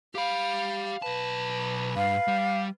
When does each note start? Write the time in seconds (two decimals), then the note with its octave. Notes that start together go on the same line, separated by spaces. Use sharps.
0.15 G4 F5 B5
1.02 B1 B4 A5
1.96 G2 F5
2.28 G3